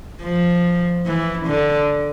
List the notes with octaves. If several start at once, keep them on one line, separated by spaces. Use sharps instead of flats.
F3
E3
D3